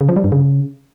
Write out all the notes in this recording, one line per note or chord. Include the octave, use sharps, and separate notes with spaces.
C#3
F3
G3
G2
C#3